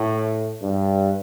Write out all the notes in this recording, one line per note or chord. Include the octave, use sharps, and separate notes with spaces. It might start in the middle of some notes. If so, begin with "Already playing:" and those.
Already playing: A2
G2